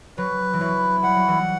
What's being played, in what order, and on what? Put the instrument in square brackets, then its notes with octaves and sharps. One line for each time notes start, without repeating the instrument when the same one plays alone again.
[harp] F#3 [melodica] B4
[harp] E3
[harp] F#3 [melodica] E4
[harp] G3 [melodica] F#5
[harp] F#3
E3 G3